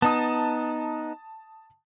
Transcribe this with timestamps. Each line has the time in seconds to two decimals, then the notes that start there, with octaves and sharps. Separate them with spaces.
0.02 B3 D#4 A5 D#6